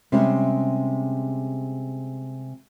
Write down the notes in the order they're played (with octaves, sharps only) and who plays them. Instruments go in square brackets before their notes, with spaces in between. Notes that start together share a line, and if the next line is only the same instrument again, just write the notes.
[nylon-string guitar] C3 G3 G#3 C#4